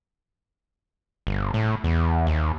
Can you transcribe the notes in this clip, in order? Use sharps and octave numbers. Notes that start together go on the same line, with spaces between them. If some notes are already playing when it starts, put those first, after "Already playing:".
G1
A2
E2
D#2